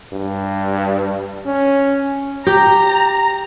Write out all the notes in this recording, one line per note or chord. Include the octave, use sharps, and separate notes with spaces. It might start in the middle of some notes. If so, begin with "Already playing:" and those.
G2
C#4
G4 A#5